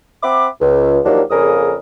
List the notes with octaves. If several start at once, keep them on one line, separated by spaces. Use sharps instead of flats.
C4 E5 F#5 B5 D6
C#2
D#2 D#3 F3 F#3 A#3 D4
F2 C#3 A#3 G#4 A#4 D#6